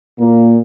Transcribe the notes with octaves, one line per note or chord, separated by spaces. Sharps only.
A#2 A#3